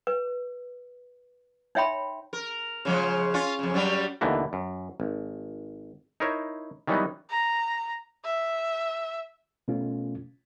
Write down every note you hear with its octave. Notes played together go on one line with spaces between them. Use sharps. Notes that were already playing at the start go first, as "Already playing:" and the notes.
B4
D#4 C#5 E5 G5 B5 C6
A#4
C#3 F3 G#3
C#4 F4
F2 C#3
F#2 F#3 G3
D#2 B2 D3 E3 A3 A#3
F#2
G#1
D#4 E4 A#4 C5 C#5
D#3 E3 F#3 G3 B3 D#4
A#5
E5
B2 A3 C#4 F4